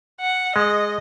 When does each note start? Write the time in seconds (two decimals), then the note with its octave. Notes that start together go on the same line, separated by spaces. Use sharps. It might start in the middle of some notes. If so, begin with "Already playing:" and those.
0.21 F#5
0.56 G#3 D#5